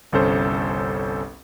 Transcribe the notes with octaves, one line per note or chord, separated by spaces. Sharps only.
G1 C2 C#4 A4 C5